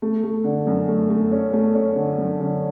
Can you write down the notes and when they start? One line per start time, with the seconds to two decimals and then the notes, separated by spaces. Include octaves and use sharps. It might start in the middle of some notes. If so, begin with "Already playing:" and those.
0.02 A3
0.23 A3
0.44 D3
0.67 F#2
0.88 A3
1.10 A3
1.32 C#4
1.53 A3
1.75 C#4
1.96 D3
2.18 F#2
2.40 D3